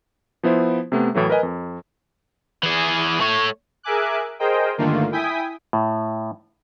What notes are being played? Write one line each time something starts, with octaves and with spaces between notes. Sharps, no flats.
F3 B3 E4 C5
C3 A3 B3
A2 E3 F#3 A3
A#4 B4 D#5 G#5
F2
E3 G#4
A3 C#5
G#4 A#4 E5 G#5 D6 F#6
G#4 A#4 C5 D#5 G5
G2 D3 D#3 A3 A#3 F4
E4 G5 G#5 D#6 B6
A2